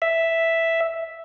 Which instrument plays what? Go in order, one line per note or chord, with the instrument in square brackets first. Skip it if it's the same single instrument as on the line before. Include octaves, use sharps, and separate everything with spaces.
[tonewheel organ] E5